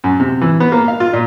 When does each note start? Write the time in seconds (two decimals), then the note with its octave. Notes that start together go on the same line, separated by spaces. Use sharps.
0.04 F#2
0.20 C3
0.41 E3
0.60 B3
0.72 A#3
0.88 F5
1.00 F4
1.13 A#2